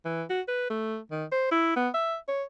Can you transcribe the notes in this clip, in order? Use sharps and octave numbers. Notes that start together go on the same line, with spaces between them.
E3
F#4
B4
A3
D#3
C5
E4
B3
E5
C#5